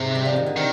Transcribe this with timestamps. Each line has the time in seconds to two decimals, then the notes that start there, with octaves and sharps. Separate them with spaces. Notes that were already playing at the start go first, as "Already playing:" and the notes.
Already playing: G#2 C3
0.15 G3
0.25 F3
0.36 D#3
0.46 D3
0.56 C3 D#3